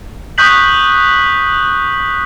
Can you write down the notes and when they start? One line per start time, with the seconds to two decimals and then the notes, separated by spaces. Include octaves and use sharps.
0.38 C#6 D#6 F#6 G6 B6 F#7